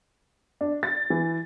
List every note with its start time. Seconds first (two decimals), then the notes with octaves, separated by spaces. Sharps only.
0.61 D4
0.83 A6
1.10 E3